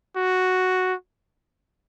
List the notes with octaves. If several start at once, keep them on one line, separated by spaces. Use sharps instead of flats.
F#4